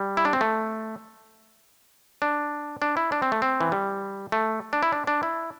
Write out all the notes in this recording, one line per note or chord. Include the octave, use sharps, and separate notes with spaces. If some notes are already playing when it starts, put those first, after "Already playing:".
Already playing: G3
E4
D4
C4
A3
D4
D4
E4
D4
C4
A3
C4
E3
G3
A3
D4
E4
D4
D4
E4